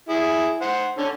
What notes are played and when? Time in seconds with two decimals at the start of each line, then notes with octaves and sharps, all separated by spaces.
0.09 E4 G#4
0.62 C5 F#5
0.98 D3 C#4